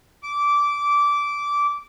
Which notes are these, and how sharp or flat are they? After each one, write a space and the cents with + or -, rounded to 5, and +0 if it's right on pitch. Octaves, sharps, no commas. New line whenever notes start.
D6 -15